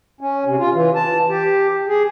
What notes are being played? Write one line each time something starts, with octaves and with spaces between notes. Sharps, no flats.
C#4
C3
F4
E3
A5
G4
G#4